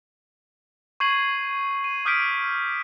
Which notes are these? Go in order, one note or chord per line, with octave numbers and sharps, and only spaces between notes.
C#6 G6 G#6 C7 D#7 F#7
D#7
D6 D#6 F6 G6 B6 D7